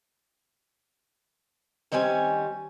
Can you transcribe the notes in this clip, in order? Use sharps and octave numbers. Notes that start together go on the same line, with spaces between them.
D#3 G3 C4 C#4 G#5